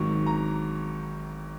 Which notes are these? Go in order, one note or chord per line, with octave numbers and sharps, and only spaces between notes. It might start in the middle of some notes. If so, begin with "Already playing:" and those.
Already playing: G#1 G#2 D#3 F#3 C#6
A#5